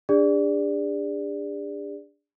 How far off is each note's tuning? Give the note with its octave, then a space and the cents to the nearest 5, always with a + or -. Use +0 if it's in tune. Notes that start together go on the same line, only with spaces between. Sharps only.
D4 +0 G#4 -40 D5 +0